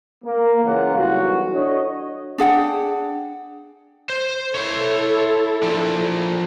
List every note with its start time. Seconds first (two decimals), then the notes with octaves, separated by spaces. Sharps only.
0.25 A#3
0.64 C#2 C#3 E3 A#3 F4 F#5
0.96 B1 E3 G3 F#4
1.53 D4 F#4 A4 C#5 D#5
2.38 D4 G#4 F#5 G5
4.09 C5
4.55 E4 A4 C#5 C6
5.63 F3 D4